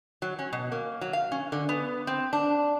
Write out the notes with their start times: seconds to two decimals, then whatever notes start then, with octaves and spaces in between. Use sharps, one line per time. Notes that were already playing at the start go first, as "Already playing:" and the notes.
0.22 F#3
0.39 C#4
0.53 B2
0.72 A#3
1.01 F#3
1.13 F5
1.32 C#4
1.52 D3
1.69 B3
2.07 C4
2.33 D4